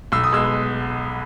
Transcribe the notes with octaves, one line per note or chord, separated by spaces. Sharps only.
B1 E6
D#6
B2 G#3 B3 E6